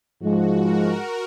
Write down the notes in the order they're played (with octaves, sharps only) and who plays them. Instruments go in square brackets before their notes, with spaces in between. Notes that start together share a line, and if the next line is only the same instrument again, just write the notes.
[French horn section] G#2 F3 G#3 [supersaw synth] F#4
[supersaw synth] A#4